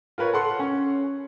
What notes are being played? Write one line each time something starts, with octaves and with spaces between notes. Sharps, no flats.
F4 A#4 B4 C#5
A4 F#5 C6
C#4